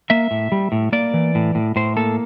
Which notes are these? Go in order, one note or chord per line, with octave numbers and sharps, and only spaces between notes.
A#3 E5
A2
G3
A2
A#3 D5
E3
A2
A2
A2 C5
A#3 A4